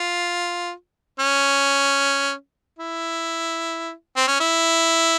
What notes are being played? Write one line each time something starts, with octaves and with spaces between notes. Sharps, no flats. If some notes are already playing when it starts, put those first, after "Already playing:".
Already playing: F4
C#4
E4
C4
C#4
E4